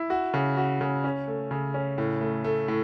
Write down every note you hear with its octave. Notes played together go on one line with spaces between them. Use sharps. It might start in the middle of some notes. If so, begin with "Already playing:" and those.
Already playing: E4
F#4
C#3
F#4
C#3
C#4
A3
C#3
C#4
A2
A3
A3
A2